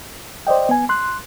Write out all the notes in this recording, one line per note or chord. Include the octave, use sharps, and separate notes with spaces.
C5 D5 D#5 G5
B3 G#5
C6 F#6